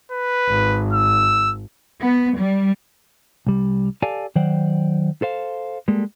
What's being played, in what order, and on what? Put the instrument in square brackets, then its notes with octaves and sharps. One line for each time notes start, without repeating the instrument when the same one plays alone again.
[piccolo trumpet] B4
[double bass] G#1
[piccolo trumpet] E6
[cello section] B3
G3
[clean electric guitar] C2 G3
G4 A4 D5 F5 G#5 A5
D#3 F#3 C5 D5 F#5 G5
A4 C5 F5
G3 G#3 A#3 A4